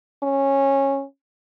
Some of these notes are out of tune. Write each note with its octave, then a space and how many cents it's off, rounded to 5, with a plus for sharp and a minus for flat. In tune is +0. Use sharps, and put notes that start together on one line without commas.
C#4 -15